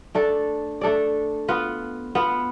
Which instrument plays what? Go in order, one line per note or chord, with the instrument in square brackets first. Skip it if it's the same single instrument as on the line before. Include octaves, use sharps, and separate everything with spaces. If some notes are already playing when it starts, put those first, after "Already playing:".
[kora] A3 D4 A4 D5
A3 D4 A4 D5
B3 F4 B4
B3 F4 B4